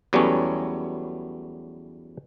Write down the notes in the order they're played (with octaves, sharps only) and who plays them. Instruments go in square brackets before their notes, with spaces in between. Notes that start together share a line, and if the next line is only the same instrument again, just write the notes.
[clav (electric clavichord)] E2 F#3 G3 A3 B3 C#4